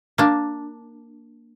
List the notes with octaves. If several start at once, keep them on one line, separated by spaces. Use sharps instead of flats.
A#3 D4